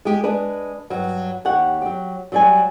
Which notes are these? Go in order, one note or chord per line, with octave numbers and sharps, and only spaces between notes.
G#3 G4
G#3 D4 G#4 B4
G2 F#3
D#2 G4 C#5 F#5
F#3 G4
F#3 G3 G#5